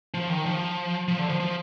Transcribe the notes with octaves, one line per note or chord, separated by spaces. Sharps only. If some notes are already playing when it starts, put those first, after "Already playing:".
F3
D#3
F3
F3
D3
F3
F3